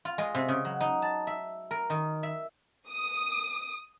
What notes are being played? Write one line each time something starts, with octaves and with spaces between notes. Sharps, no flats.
F4
G#3
C3
C#3
F#3
D#4
A5
E5
A#4
D#3
E5
D#6